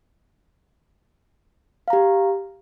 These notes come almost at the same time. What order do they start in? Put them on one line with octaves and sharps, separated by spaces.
F5 A#5 G4